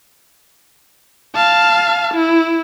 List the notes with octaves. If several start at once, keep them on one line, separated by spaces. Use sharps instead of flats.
F5 A5
E4